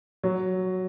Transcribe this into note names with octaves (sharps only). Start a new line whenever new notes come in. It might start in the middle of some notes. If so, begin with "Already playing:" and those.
F#3